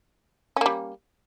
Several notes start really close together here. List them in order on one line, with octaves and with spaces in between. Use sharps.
C#4 A#3 G3